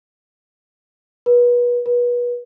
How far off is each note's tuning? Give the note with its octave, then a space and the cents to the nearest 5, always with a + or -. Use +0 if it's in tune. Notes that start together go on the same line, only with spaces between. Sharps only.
B4 -30
B4 -30